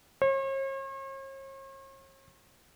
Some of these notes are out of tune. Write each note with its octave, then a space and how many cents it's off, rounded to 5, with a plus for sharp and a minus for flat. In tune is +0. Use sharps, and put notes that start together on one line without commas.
C#5 -45